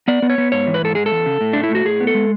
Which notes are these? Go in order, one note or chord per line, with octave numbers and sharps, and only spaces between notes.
B3 D5
B3
C#5
B3
G#2 C#5
E3
B4
G#2 A4
G#3 G#4
A4
E2
C#3
A2
A3 D4
E4
A2 F#4
A2 G#4
B3
A4
G#3